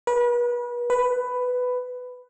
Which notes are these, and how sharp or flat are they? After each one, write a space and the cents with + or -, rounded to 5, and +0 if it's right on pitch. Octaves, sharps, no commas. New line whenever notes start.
B4 -35
B4 +10